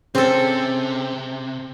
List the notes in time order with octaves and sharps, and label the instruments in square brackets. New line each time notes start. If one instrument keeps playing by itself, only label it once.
[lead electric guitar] C3 [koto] C4 A4 [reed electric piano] C#4 G#4 C5